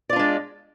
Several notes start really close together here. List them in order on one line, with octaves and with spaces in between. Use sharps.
D5 F4 D4 G#3